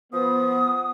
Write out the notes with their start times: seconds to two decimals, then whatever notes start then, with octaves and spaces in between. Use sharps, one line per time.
0.13 F3 B3 D#6